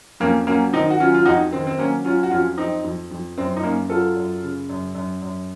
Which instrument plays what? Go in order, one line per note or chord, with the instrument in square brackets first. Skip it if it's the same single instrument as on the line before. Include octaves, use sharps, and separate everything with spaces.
[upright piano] F2 A#3 C#4
F#3 A#3 C#4
D#3 C4 D#4
F#4
F#3 C#4 F4
F4
F2 D#4 F#4
D#3 C4
C4
F#3 A#3 C#4
F#3 C#4 F4
F#4
F2 C#4 F4
F2 C4 D#4
F2
F2
F#2 C4
D#4
F#2 A#3 C#4
F#3 F4 A4
F#2
C#3
F#2
F#2
F#2